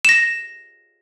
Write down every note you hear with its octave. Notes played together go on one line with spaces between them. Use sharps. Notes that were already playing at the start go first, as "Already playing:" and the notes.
A#6 E7